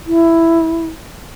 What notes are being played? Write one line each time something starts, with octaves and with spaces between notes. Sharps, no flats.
E4